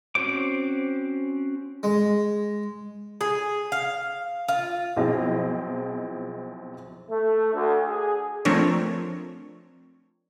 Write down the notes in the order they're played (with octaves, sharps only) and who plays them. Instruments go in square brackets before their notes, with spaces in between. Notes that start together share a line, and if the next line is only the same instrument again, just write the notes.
[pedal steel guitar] C4 C#4 F#4 C5 D6
[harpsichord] G#3
[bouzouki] G#4
F5
F4
[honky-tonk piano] B1 F3 C4 E4 G#4 D#5
[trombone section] A3
D2
G#4
[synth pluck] F3 A3 C4 D4 A#4 C#5